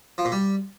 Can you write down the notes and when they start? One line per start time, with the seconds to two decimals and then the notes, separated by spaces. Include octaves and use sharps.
0.18 F3
0.25 A#2
0.32 G3